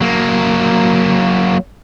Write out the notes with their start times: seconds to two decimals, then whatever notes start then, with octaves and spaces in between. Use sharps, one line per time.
0.01 F#3 A#3